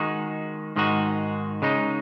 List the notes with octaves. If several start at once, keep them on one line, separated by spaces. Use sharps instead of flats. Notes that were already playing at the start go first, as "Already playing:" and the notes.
Already playing: D#3 G#3 D#4 F#4
G#2 D#3 G#3 D#4 F#4
C#3 G#3 D#4